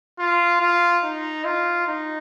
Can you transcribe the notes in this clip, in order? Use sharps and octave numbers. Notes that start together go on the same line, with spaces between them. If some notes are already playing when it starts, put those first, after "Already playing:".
F4
F4
D#4
F4
D#4